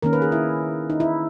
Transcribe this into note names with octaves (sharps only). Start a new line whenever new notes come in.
D#3 A#3 C#4 A#4
B4
G#4
E4
D#4
E4